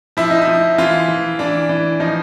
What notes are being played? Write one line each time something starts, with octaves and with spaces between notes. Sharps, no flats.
F3 E4
D#4
E4
F3
E3 F4
E3
E3 D4
E3
F3 D#4